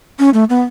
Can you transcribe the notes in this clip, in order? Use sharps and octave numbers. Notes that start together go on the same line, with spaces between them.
C#4
A3
B3